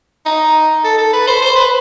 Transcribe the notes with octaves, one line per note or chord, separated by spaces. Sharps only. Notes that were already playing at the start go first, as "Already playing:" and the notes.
D#4
A4
A4
B4
C5
C5
B4